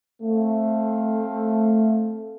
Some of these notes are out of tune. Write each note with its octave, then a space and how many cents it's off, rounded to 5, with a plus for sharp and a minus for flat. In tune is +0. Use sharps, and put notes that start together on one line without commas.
A3 +0 C4 +20 F5 +0